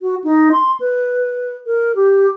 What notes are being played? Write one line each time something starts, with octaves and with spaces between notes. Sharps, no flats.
F#4
D#4
C6
B4
A#4
G4